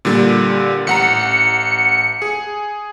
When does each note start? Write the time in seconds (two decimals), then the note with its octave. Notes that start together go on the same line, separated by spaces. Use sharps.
0.05 A#2 D3 G3
0.87 A1 F#5 A#5 C#7
2.22 G#4